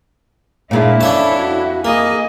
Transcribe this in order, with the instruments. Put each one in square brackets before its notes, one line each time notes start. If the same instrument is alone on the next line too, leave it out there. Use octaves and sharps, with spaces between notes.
[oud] A#2 G#3 D4 [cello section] E4
[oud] F2 [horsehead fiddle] C#4 C#5 [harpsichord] D4 A4 A5
[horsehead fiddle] F#4
[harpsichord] A#3 [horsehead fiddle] G#4 D#5